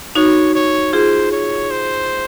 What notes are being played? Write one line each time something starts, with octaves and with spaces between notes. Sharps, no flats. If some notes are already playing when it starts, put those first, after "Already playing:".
D#4 F#4 C#5
C#5
F4 G#4 C5
C#5
C5